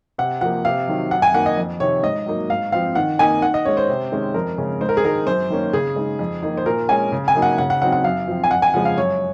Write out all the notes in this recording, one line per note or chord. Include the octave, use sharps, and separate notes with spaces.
C3 F#5
F3 A#3 F#5
C3 F5
D#3 F#3
F#2 F#5
G#5
D#3 A#3 F#5
D#5
F2
C3 D#3 C#5
G#2 D#5
F#3 A#3 D#4
G#2 F5
F3 C4 F5
D#3 F#5
A#3 D#4 G#5
D#3 F#5
D#5
G#3 C#4 C#5
C5
C3
D#3 G#3 C#4
F2 A#4
C#3 G#3 C#4
G#2 C5
A#4
G#4
D#3 G#3 D#4 A#4
F#2 C5
D#3 A#3 C#4
C#3 G#4
G#3 D#4
F2
D#3 A#3 D#4
C5
A#2 A#4
G#3 C#4 G#5
C#3
G#5
F#3 A#3 D#4
F#5
C#3 F#5
F#5
F#3 C4 D#4 F#5
F#5
F#2 F5
F3 C4
G#5
F2 F#5
G#5
C#3 F3 G#3 F#5
F5
F#2 C#5